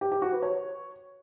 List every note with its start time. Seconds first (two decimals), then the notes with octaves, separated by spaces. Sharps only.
0.01 G4
0.12 G4
0.22 F#4
0.32 B4
0.43 C#5